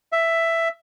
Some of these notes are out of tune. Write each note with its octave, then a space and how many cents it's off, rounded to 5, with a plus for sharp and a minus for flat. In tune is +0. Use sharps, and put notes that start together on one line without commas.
E5 +5